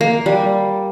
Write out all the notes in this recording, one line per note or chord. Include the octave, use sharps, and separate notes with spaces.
A#3
G3